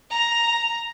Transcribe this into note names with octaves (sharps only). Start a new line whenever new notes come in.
A#5